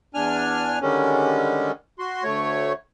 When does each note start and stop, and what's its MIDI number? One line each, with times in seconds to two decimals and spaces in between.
0.14 0.79 40
0.14 0.79 62
0.14 0.79 80
0.14 0.79 89
0.82 1.72 50
0.82 1.72 51
0.82 1.72 55
0.82 1.72 56
0.82 1.72 61
1.99 2.23 66
1.99 2.23 84
2.24 2.73 38
2.24 2.73 57
2.24 2.73 73